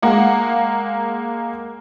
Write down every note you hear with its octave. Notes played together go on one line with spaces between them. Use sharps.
G#3 A#3 F#5